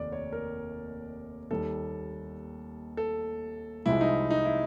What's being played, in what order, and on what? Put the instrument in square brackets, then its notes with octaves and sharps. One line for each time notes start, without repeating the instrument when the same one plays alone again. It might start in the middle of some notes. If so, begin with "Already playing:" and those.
Already playing: [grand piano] F1 D#2 D#3 D5
C#5
A#4
D#2 D#3 G3 A4
A4
C2 C3 F3 G#3 E4
D#4
D#4
E4